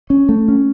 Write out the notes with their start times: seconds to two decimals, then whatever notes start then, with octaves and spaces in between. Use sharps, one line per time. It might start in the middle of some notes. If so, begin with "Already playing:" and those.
0.10 C#4
0.29 A3
0.48 C#4